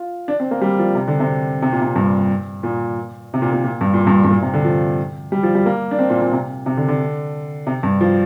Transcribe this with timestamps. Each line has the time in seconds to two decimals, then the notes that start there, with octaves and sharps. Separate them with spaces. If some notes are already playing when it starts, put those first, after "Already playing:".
Already playing: F4
0.28 D4
0.40 C4
0.51 A#3
0.61 G3
0.79 F3
0.95 C3
1.08 D3
1.20 C3
1.62 C3
1.72 A#2
1.82 C3
1.96 G2
2.63 A#2
3.34 C3
3.42 A#2
3.53 A#2
3.64 A#2
3.81 G2
3.94 A#2
4.07 G2
4.24 G2
4.31 A#2
4.42 C3
4.54 D3
4.65 F3
5.32 G3
5.43 F3
5.55 G3
5.66 A#3
5.91 D4
5.99 C4
6.10 A#2
6.21 A#2
6.33 C3
6.66 C3
6.77 D3
6.88 D3
7.67 C3
7.83 G2
8.01 F3